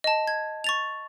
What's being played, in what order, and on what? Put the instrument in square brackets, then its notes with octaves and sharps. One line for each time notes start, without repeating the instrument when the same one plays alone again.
[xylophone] D#5 A5
G#6
C#6 A6 F7